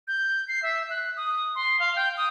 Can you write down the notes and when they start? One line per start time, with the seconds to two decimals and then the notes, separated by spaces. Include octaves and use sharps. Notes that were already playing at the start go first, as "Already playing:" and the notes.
0.08 G6
0.48 C7
0.63 E5
0.90 F#6
1.17 D#6
1.55 C6
1.80 F5
1.96 G5
2.17 D#6